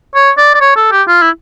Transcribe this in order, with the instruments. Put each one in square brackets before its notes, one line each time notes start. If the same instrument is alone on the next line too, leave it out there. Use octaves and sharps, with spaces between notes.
[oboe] C#5
D5
D5
C#5
A4
G4
F4
E4